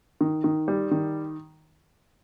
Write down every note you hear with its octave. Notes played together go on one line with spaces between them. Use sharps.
D#3
D#3
G3
D#3